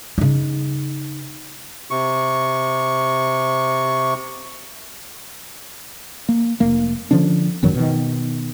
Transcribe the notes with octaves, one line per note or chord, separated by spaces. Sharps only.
C#3 D#4
C3 C#6
A#3
F1 A#3
D3 F3 C#4 D4
G#1 F#2 D#3 F#3
B2 D#3